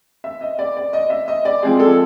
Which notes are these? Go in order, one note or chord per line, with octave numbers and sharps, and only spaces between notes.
E5
D#5
D5
D5
D#5
E5
D#5
D5
F3 G#3 C4 G#4
A4